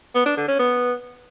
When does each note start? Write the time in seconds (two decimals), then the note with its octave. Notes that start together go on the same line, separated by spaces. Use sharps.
0.15 B3
0.26 D4
0.37 D3
0.48 C#4
0.59 B3